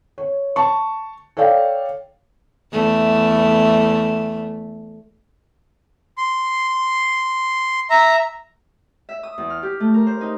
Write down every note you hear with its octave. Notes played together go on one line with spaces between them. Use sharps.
C#5
A5 C#6
A4 C#5 D5 F5 G5
E2 A3
C6
E5 A#5
E5
D#6
E2
F6
G4
A3
A#4
C5
D#4